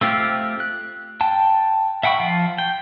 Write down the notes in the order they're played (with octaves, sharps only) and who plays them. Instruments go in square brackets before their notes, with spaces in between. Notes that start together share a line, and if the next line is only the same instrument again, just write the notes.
[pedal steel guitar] A3 C4 F4 G4
F#6
G5 A5
E5 F#5 G5 B5 C#6
F3 F4
G5